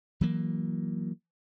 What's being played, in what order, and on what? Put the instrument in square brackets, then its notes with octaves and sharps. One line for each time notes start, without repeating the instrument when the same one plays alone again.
[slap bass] E3 F#3 A#3